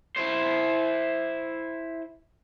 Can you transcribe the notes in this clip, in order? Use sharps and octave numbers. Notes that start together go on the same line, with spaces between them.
E4 C5